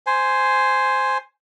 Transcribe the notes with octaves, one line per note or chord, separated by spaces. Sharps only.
C5 G#5